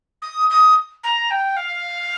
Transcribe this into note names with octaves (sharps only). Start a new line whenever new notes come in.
D#6
D#6
A#5
G5
F5